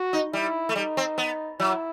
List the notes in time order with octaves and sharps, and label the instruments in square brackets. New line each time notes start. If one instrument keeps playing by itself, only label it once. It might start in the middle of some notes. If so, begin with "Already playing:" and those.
Already playing: [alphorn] F#4
[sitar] D#4
[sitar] G3 [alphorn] E4
[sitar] A3
[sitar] G3 [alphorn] D#4
[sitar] C4
B3
[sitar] F#3 [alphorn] E4